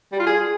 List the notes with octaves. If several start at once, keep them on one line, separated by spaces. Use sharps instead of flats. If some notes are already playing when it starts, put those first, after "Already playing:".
G3
F4
G#4